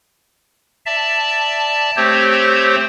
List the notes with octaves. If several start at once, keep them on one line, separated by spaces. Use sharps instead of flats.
D5 E5 A5
A3 C4 G4 C5 C#5